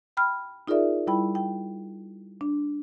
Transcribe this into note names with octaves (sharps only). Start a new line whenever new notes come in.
G5 B5 F6
D#4 F4 G#4 A#4 D5 E5
G3 E4 G5 B5
G5
D4